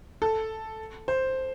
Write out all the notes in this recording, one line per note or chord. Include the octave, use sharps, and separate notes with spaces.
A4
C5